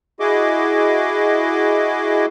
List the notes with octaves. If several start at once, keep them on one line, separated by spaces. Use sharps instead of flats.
E4 F#4 G#4 D#5 D6